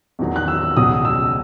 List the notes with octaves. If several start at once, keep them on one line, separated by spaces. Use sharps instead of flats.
E2 D#3 F#3
F#6
E6
C#2 B2 F#3 D#6
E6